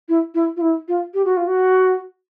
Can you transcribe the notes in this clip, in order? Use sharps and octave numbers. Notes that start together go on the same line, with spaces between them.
E4
E4
F4
E4
F4
G4
F#4
F4
F#4